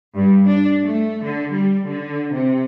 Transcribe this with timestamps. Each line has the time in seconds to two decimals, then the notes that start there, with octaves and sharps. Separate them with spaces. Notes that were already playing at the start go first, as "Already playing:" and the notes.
0.15 G2
0.47 D4
0.84 A3
1.23 D3
1.52 G3
1.86 D3
2.33 C3